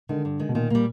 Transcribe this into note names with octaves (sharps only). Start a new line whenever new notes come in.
D3 D#3 G#3
G2
D#3 G#3
B2
A#2 D#3
A#2 G3 A#3